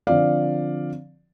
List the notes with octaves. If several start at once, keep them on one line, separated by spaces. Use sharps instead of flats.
D3 F3 C4 D5 F5